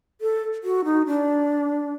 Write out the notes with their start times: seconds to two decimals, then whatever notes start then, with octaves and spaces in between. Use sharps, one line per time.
0.21 A4
0.64 F#4
0.84 D#4
1.06 D4